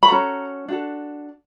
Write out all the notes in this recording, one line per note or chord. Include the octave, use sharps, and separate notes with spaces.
B5
C#4 F#4 A4 A#5
D4 F#4 A4